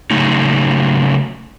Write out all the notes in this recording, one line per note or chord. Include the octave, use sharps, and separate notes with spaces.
C#3 F#3 A3 D#4